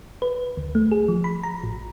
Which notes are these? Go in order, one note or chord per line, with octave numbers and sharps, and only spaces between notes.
B4
D2
A3
G#4
F3
B5
A#5
A1